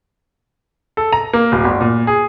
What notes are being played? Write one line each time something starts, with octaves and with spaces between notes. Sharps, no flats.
A4
A#5
A#3
D1
G1
A#2
G#4